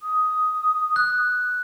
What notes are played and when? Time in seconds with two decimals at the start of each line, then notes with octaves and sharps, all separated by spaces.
0.03 D#6
0.96 F#6